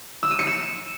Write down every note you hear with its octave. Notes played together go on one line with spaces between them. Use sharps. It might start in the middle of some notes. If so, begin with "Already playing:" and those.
E6
D#7
C#7
E7